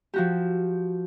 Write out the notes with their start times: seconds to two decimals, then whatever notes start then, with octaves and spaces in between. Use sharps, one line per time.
0.14 F3 F#4 G4